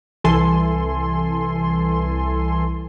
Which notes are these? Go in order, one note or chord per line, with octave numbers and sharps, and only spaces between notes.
C2 E3 A4 G#5 C6